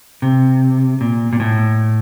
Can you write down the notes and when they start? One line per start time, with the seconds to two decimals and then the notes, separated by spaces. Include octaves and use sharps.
0.22 C3
1.01 A#2
1.33 A#2
1.40 A2